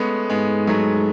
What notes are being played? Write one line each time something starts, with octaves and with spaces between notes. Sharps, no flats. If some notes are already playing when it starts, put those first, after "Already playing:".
Already playing: G#3 A3 B3 C#4
G#2 G#3 B3
F#3 A3